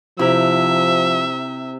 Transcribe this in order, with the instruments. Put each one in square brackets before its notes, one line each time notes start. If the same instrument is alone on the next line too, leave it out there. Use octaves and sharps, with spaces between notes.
[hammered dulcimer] C3 A#5 [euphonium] F3 [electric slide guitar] E4 G4 [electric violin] E5